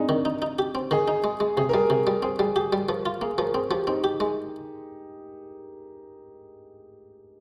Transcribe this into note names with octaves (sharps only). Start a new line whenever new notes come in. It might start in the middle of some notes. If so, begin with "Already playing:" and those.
Already playing: G#3 C4 D4 D#4
D#3
D#4
D#4
G4
C4
D#3 G#4
D#4
G#3
G#3
C3 G#4
A#4
G3 G#4
C3
G3
C4 G#4
G3 G#4
G4 G#4
G3
F3 A#4
F4
A#3 G#4
F3 A#4
C4 G#4
F3 G4
C4 D#4
G4
G#3